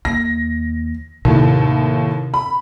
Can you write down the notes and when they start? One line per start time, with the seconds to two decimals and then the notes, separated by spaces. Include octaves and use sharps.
0.05 D#2 A#6
1.25 D#2 A2 C3
2.34 B5